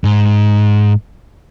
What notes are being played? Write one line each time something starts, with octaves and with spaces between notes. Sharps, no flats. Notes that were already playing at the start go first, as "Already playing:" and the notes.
G#2